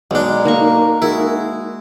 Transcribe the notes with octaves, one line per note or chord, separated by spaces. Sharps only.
B1 G#3 B3 D4 D#4
A#3 D#4 A#4 A#5 C#6
G#3 E4 F#4 G#4